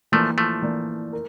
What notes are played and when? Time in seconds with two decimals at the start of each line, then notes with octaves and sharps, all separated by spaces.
0.12 E3 F3 A3 A#3 D4
0.38 F3 A3
0.62 E3 A#3 D4
1.13 A#4